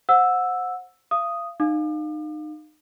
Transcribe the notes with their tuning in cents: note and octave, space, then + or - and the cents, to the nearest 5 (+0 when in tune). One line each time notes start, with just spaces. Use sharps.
C5 +0 F#5 -25 E6 +0
F5 -35 D#6 +0
D#4 -30 F5 +15 D6 +40